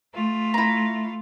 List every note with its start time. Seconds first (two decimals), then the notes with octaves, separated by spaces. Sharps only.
0.13 A3 F4
0.54 E4 A#5